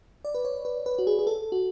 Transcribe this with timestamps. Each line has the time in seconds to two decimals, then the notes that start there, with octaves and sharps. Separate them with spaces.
0.25 D5
0.34 B4
0.45 C#5
0.65 B4
0.86 B4
0.99 F#4
1.07 G#4
1.19 G#4
1.27 A4
1.52 F#4